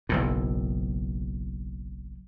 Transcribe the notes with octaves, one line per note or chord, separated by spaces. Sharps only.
F#1 B1 A2